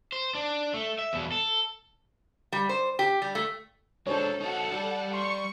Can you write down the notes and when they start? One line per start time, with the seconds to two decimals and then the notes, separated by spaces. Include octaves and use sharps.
0.12 C5
0.35 D4
0.74 A3
0.99 E5
1.13 E2 B2
1.32 A4
2.52 G3
2.69 C5
2.99 G4
3.22 G3
3.35 A3
4.07 G#3 D4 D#4 A4 C5 C#5
4.40 D#4 F#4 A4 F#5 C#6
4.72 G3 D5
5.14 C6 C#6